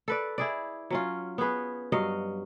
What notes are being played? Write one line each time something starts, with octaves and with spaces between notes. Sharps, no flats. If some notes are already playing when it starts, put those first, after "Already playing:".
A4 B4 D5
E4 G#4 D5
F#3 C#4 F4
B3 C#4 G#4 B4
G2 F#3 D#5 F5